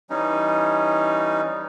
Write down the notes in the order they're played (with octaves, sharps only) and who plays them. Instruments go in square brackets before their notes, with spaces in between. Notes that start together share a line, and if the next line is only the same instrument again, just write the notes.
[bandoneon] E3 G3 C#4 D#4